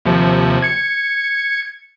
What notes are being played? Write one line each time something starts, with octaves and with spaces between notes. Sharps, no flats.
D#2 C3 F3
G#6 C#7